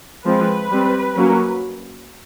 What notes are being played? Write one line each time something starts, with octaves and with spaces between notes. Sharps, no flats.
F3 G#3 C4 B4
G3 C4
F#3 A#3 C#4